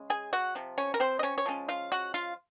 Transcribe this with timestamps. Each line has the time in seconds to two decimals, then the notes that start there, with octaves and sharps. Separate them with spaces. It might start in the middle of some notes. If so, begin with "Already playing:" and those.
Already playing: C#3 G#3 C#4
0.10 G#4 G#5
0.33 F#4 F#5
0.55 C3 F3
0.78 C#4 C#5
0.94 A#4
1.00 C4 C5
1.19 D#5
1.23 C#4 C#5
1.38 C#5
1.46 F3 G#3 C#4 F4
1.69 F4 F5
1.92 F#4 F#5
2.14 F4 F5